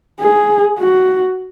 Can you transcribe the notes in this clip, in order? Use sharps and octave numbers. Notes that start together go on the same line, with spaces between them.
G#4
F#4